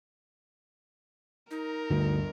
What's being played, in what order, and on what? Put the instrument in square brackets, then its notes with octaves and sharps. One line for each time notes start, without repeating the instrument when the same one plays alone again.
[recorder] D#4 [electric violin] A#4
[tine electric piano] D2 [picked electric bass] G2 D3